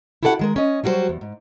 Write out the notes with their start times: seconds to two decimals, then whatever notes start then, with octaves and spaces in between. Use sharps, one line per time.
0.23 E4 F#4 G4 A4 D5 F#5
0.39 D#3 G#3 A#4
0.56 C#4 D#5
0.84 F#3 G3 F#4 G4 C5
1.09 E2
1.21 G#2